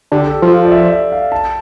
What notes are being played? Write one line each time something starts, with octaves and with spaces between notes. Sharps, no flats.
D3 G4
A4
F3
D5
E5
E5
F5
A5